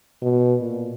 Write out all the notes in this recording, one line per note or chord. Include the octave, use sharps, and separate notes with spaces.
B2
A#2